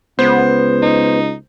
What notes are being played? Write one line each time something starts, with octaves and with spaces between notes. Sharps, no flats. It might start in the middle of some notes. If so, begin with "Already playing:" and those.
C#2 B3 C5
D#4